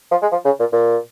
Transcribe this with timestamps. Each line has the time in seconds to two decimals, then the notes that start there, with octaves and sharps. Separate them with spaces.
0.11 F3
0.22 G#3
0.32 F3
0.45 C#3
0.60 A#2
0.72 A#2